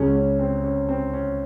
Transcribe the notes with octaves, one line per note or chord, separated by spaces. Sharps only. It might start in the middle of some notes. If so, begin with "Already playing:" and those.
Already playing: C#2 C#3 G#3 C#4
C#4
C4
C#4
C4
C#4